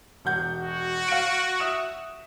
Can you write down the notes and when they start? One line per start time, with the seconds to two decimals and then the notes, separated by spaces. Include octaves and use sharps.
0.25 E1 F#5 G6
0.60 F#4
1.08 F5 D7
1.60 E5 D#6 E7